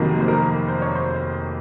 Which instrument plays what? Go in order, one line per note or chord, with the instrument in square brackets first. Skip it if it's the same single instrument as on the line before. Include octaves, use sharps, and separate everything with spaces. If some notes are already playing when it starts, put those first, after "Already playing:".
Already playing: [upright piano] F1 F2 D#3 F#3 A#3
C5
A#4
C5
C#5
C5